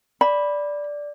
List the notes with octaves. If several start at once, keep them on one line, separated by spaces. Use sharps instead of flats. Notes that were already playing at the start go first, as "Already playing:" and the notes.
D5 B5